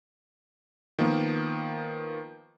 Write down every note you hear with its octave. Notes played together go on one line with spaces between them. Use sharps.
D#3 F3 A#3 B3